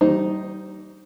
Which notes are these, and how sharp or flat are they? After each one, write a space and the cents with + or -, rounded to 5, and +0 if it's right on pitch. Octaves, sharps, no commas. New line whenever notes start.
G3 -30 D#4 +0 C5 +0